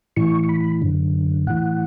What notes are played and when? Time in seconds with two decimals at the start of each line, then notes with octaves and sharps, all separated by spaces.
0.17 A2 E3 C#6
0.44 C#6
0.49 B5
0.60 B5
0.82 F#2 D3
1.47 A2 E3 F#5